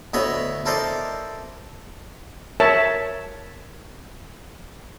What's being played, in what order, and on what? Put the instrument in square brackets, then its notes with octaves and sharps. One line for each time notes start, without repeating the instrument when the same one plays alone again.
[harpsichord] D2 B3 E4 C#5 D#5 B5
E4 A4 A#4 C5 D5 D#5
[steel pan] A#4 C#5 E5 A5